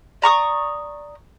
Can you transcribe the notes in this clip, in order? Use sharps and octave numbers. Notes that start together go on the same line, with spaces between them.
D5 A#5 C#6 D#6